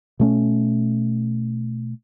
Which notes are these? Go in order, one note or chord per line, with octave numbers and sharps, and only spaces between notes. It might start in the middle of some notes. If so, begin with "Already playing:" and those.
B2 A3 C#4